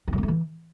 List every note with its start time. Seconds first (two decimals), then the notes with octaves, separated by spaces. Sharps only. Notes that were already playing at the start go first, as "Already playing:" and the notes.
0.08 C4
0.13 G2
0.18 A#3
0.23 A3
0.28 E3